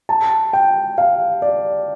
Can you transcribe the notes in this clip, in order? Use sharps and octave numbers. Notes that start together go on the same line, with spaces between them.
A5
G5
F5
D5